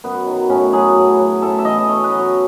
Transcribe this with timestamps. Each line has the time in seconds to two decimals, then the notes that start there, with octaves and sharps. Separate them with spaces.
0.04 F#2 B3
0.27 D#3 F#3
0.49 A2 C#4
0.73 F#3 G#4
0.95 A2
1.19 F#3
1.42 A2 A4
1.59 E5
1.65 E3 D#5
1.78 D#5
1.87 B2 C#5
2.04 B4
2.11 F#3
2.19 C#5